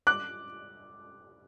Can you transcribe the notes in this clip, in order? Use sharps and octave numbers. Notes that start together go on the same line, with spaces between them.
D6 F#6